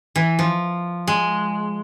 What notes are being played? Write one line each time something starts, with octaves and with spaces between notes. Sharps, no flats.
E3
F3
G#3